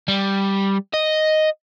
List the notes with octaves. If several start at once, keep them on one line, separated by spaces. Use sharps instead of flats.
G3
D#5